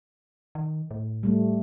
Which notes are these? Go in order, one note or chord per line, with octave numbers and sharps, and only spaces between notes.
D#3
A2
G3 A3